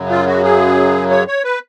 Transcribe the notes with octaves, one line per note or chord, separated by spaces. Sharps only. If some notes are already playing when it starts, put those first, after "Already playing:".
Already playing: F#2 C#3 F#3
F4
F#4
G#4
C#5
C#5
B4